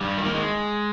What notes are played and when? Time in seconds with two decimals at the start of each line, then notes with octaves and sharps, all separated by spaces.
0.01 G2 G3
0.18 D#3
0.26 A#3
0.35 G#3